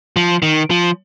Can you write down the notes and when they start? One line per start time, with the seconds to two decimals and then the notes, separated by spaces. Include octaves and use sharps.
0.16 F3
0.42 D#3
0.70 F3